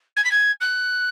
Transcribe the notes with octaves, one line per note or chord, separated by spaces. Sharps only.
G#6
B6
G#6
F#6